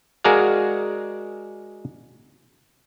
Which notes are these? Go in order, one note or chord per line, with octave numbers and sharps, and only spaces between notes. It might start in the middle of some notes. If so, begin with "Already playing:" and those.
G#3 F#4 G#4 A#4 D5 F5